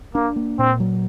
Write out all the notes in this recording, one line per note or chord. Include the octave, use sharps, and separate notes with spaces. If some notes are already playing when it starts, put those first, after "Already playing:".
A#3 D4
A#3
A#2 C4
F#3